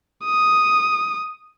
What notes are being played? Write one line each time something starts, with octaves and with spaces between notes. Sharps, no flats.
D#6